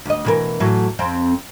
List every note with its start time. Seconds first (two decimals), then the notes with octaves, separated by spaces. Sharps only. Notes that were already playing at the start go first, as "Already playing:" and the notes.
0.05 D2 D#5
0.25 B2 E3 A#4
0.60 A2 E3 F#3
0.99 F2 C4